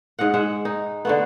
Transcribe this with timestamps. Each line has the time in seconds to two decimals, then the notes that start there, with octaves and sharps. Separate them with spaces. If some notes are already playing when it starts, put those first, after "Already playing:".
0.19 G#2 D#5 F5 F#5
0.34 G#3 E5 F#5
0.65 D#4
1.05 D3 A3 B3